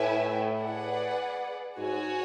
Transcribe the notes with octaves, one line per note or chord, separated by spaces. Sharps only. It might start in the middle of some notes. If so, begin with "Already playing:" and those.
Already playing: A2 E4 B4 E5 G#5
G#4 B4 D5 F#5
G#2 F#4 C#5 G#5